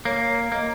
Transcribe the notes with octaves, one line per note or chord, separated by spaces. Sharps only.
A#3 C#5
A#3 D#5